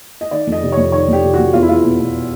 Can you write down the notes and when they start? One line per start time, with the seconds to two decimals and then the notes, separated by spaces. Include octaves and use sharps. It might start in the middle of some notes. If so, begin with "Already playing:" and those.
0.21 D#5
0.31 D#3 D5
0.47 F2
0.52 D#5
0.63 C3
0.72 F2 C#5
0.92 D#3 C#5
1.08 F2 G4
1.23 C3
1.34 F2 F#4
1.53 E2 F4
1.62 E4
1.69 E2 F4
1.84 B2
1.99 B2